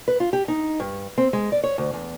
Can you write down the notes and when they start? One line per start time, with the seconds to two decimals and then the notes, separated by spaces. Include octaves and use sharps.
0.08 B4
0.20 F4
0.33 G4
0.48 D#4
0.80 G2
1.18 C4
1.33 G#3
1.52 D5
1.64 C#5
1.78 D2
1.94 E2